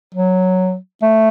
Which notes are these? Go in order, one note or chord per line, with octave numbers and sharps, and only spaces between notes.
F#3
A3